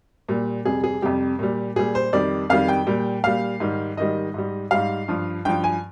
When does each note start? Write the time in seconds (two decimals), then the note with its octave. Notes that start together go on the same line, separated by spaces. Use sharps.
0.29 A#2 G3
0.65 F2 C3 G3 G#4
0.84 G#4
1.02 F2 C3 G3 G4
1.39 A#2 G3
1.76 A#2 G3 G#4
1.95 C5
2.13 F2 D#3 G3 D5
2.50 F2 D#3 G3 F5
2.68 G5
2.87 A#2 G3
3.24 A#2 G3 F5
3.60 G#2 D#3 G3
3.97 G#2 D#3 G3 D#5
4.34 G#2 G3
4.71 G#2 G3 F5
5.08 G2 F3
5.45 G2 F3 G5
5.64 G#5